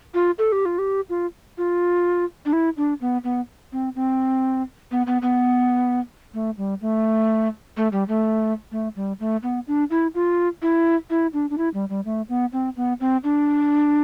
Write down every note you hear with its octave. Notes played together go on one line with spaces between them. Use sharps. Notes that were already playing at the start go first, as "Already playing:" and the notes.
F4
A4
G4
F4
G4
F4
F4
D4
E4
D4
B3
B3
C4
C4
B3
B3
B3
A3
G3
A3
A3
G3
A3
A3
G3
A3
B3
D4
E4
F4
E4
E4
D4
D4
E4
G3
G3
A3
B3
C4
B3
C4
D4